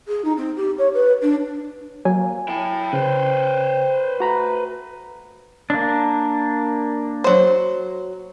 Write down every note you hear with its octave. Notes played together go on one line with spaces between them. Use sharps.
G#4
D#4
C4
G4
C#5
B4
D4
F#3 A#3 G#5
E4 G5 A5
C#3 B4 C5
A3 F#4 A#5 B5
A#3 D4
F#3 C5